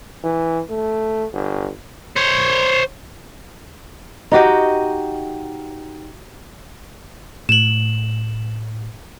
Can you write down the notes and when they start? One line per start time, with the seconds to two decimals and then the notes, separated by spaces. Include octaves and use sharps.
0.24 E3
0.70 A3
1.33 G1
2.16 C5 C#5
4.32 D#4 F#4 G4 D#5
7.49 A2 E7 F#7